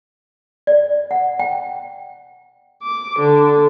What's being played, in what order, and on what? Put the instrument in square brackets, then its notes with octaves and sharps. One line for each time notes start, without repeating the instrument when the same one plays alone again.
[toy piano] D5
F#5
G5
[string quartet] D6
D3